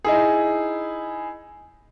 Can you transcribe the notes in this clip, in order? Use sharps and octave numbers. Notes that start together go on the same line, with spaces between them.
D#4 E4 G#4